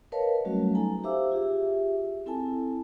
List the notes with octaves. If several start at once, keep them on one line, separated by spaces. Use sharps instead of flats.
A#4 B4 C#5 D#5 F5 A5
F#3 G3 A3 C#4 F#4
D#4 A4 G#5 A#5
G4 C5 E5 F5 D6 E6
F4 G4 G#4 E5
C4 E4 A4 G#5 A5